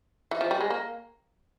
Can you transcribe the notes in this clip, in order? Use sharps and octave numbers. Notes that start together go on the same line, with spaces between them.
E3
F3
G3
G#3
A#3